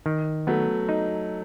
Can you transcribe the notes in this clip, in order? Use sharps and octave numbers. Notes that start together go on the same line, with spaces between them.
D#3
F#3 A3 B3
D#4